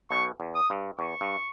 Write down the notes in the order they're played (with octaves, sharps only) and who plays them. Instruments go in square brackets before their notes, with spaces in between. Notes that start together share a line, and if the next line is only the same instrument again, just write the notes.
[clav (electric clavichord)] B1 B2 [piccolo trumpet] C#6
[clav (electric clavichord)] E2
[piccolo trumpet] D#6
[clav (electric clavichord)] G2
[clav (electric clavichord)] E2 [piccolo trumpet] C#6
[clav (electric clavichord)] G2